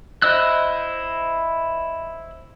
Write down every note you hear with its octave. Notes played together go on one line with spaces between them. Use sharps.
E4 C5 D#5 E6 F#6